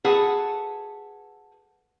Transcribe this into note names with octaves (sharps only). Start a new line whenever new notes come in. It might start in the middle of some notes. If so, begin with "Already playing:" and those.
F#4 G#4 A4 B4 F#5